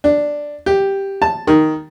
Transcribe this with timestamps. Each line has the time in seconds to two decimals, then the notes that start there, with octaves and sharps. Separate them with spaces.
0.04 D4
0.66 G4
1.22 A5
1.47 D#3